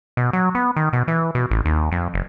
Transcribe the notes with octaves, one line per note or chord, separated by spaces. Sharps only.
B2
F#3
B3
D#3
B2
E3
B2
A1
D#2
F2
F#1